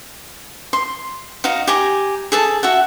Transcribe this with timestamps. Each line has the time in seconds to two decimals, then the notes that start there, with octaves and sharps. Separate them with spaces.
0.73 C6
1.44 D#4 F#4 F5 A#5
1.67 G4 G#5 A#5
2.32 G#4 A4 A5
2.63 F#4 E5 F#5